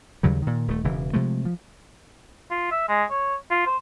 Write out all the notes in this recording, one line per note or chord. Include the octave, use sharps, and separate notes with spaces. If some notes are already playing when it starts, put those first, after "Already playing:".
D#2 C#3 F#3 G3
A#2 D#3
D#1 A3
E1 C#3 E3
C3 F3 G#3 A3
F3
F4
E5
G#3
C#5
F4
C5